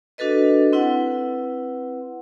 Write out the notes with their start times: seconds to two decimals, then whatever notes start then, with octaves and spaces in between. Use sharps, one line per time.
0.18 D4 F#4 A4 B4 D#5
0.73 C4 E4 B4 F#5